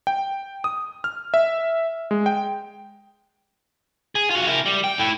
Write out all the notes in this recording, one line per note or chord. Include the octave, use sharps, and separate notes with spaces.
G5
D#6
F6
E5
G#3
G5
G#4
F4 F#4
E4 A#4
G3
G5
E4 A4